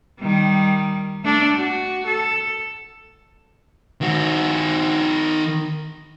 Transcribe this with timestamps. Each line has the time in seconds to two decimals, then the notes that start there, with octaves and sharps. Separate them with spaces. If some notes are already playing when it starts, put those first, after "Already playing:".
0.19 D#3 G3
1.24 A3 D4
1.56 F#4
2.06 A4
4.01 D#3 F#4